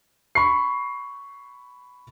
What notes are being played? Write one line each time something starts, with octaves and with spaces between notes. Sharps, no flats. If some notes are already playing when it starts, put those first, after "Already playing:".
B5 C#6 C7